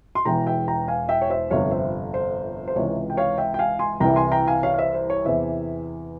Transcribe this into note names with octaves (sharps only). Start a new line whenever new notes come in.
C6
E1 E2 E3 G5 A#5
E5 G5
G5 A#5
F5 G#5
E5 G5
C#5
C5 E5
G1 F2 C3 F3 C#5 F5
C5 E5
C5
C5
C#2 C3 E3 C#5
G5
C#5 F5
E5 G5
G5
F5 G#5
G#5 C6
C2 C3 E3 G5 A#5
G#5 C6
G5 A#5
F5 G#5
C#5 F5
F5
C5 E5
C5
C#5
E2 C3 E3 C5 E5